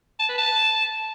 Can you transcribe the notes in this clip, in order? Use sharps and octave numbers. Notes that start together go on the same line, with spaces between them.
A5
B4
A5